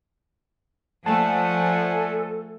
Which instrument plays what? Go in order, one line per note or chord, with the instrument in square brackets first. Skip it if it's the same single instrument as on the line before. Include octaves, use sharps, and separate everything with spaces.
[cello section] F3 A3 [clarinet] A4 [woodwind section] D5 F#5 G#5 [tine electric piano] A5